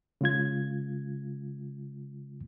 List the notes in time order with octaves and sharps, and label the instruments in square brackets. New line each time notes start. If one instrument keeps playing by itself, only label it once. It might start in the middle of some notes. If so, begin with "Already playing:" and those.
[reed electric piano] C#3 G#3 F4 G#6